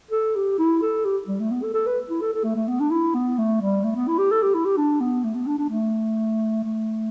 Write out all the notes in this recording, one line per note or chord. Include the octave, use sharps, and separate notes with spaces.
A4
G4
E4
A4
G4
G3
A3
B3
A4
A4
B4
E4
A4
A4
A3
A3
B3
D4
E4
B3
A3
G3
A3
B3
E4
G4
A4
G4
E4
G4
D4
B3
A3
B3
D4
D4
A3
A3